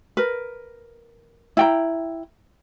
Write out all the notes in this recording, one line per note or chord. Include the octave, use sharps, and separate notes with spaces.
A#4 B4
E4 G5 A#5